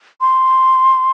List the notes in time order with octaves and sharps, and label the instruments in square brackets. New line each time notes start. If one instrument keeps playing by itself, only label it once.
[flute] C6